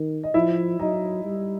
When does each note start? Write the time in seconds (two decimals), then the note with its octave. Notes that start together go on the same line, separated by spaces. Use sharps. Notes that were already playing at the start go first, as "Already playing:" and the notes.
Already playing: D#3
0.23 D#5
0.34 F3 E4 E5
0.79 F#3 D#4 D#5
1.24 G3